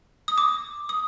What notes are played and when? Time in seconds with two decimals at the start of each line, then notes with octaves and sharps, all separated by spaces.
0.28 D#6
0.38 D6
0.89 D#6